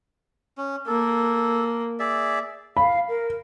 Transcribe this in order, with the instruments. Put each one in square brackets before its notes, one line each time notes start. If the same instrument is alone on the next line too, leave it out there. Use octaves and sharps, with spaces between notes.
[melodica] C#4
[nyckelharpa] A#3 [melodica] A4
[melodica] G#4 D5 E5
[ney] F5 [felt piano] B5
[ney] A#4